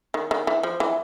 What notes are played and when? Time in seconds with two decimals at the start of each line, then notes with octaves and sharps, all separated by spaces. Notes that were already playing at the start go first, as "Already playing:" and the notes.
0.14 D#3
0.31 D#3
0.47 E3
0.63 F3
0.80 E3